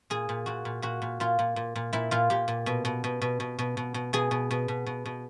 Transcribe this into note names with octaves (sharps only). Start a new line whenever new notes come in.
A#2 G#4
A#2
A#2 F#4
A#2
A#2 F#4
A#2
A#2 F4
A#2
A#2
A#2
A#2 E4
A#2 F4
A#2 G4
A#2
B2
B2
B2
B2
B2
B2
B2
B2
B2 G#4
B2
B2
B2
B2
B2